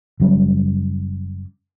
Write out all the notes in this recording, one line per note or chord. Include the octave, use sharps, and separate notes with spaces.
F#1 F#2 G3